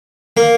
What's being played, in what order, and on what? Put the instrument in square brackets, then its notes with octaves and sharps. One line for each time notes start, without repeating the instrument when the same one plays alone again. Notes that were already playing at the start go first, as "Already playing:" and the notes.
[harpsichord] A#3